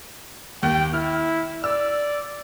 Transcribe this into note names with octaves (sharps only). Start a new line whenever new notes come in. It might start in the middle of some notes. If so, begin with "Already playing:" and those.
D#2 G5
E4 F6
D5 E6